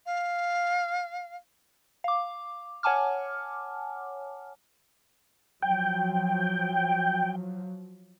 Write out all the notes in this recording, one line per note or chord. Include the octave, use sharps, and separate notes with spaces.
F5
F5 D6
C#5 F#5 G#5 A5 D6 F6
F3 F#3 G5